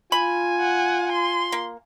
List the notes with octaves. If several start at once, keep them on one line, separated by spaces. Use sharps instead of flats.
F4 G#5 B5
F#5
C6
A#3